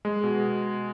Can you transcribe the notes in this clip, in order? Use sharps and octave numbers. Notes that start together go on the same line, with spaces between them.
G#3
B2